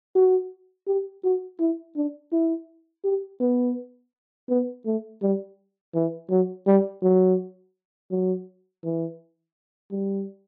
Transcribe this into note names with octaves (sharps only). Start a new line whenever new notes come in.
F#4
G4
F#4
E4
D4
E4
G4
B3
B3
A3
G3
E3
F#3
G3
F#3
F#3
E3
G3